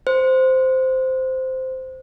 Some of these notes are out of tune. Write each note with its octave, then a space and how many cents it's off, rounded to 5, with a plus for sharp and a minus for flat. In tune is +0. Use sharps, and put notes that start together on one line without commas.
C5 -10